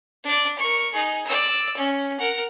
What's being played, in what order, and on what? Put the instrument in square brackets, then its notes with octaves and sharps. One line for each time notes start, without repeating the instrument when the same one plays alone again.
[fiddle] D4 D5
A#4 C#6
D#4 G#4
D5 E6
C#4
A#4 F#5